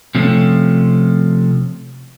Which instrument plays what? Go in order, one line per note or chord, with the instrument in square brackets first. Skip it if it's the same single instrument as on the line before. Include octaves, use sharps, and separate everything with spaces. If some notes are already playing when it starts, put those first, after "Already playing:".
[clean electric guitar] C3 F3 A3 C#4